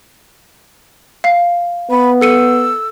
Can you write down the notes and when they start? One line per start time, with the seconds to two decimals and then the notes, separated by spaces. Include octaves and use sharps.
1.24 F5 C7
1.91 B3 B5
2.21 A4 E6 C#7 D#7